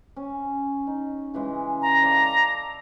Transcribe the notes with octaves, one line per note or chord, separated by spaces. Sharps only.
C#4
D#4
C#3 E3 G#3
A#5
A4 D5 F5